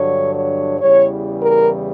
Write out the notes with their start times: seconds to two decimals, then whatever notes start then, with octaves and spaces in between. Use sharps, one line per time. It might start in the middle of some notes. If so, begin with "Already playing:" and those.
Already playing: G2 D3 F#3 C#5
0.34 C#5
0.79 E2 C#3 E3 G3 C#5
1.40 A#4